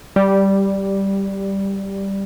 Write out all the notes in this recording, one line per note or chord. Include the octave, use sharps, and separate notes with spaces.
G3